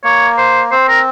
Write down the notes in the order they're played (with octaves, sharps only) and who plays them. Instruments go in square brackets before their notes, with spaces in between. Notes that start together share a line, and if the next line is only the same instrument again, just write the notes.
[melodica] A#3 [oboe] C#5
[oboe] C5
[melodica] C4 [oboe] C5
[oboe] A#4